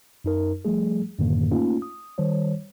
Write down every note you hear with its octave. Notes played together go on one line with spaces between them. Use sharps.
F#2 D#4 A#4
F3 G3 A3 G#4
F#2 A2 D3 D#3 A#3
A3 A#3 C#4 D#4 F4
D#6
D#3 G3 C5 C#5